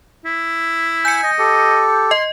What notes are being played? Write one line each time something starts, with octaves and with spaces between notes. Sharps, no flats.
E4
G#5 G6 C#7
D#5
G4 A4
D#5 C6